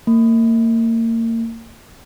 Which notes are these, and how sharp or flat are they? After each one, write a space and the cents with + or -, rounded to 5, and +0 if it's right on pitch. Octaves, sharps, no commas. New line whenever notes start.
A#3 -35